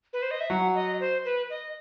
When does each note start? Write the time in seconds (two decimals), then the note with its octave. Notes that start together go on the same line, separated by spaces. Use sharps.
0.13 B4
0.22 C5
0.31 D#5
0.41 E5
0.50 F#3 F#5
0.75 D#5
1.00 C5
1.25 B4
1.50 D#5